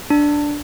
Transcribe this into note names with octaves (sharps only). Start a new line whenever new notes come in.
D4